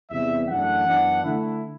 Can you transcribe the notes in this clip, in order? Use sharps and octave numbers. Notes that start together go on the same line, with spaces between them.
E2 C3 E3 G3 B3 E5
F#2 E3 A3 D4 F#5
F#2 E3 B3 D4
D3 A3 E4